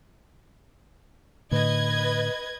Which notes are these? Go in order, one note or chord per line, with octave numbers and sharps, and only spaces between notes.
A2 D3 B4 D#5 G#6